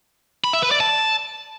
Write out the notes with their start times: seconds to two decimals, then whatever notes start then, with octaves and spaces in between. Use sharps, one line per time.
0.44 B5
0.53 E5
0.62 B4
0.71 D5
0.80 A5